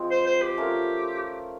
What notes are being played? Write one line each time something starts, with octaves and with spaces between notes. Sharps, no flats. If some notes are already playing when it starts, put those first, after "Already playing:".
Already playing: F3 G#3 C4
C5
C5
G4
A3 C#4 F4 A#4